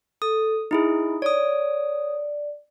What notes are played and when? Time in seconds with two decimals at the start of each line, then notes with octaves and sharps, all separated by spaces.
0.22 A4 D#6
0.71 D#4 E4 G#4 D#6
1.22 C#5 D5 D#6